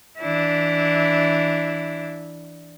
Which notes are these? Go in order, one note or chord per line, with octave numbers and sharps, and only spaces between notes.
E3 D4 E4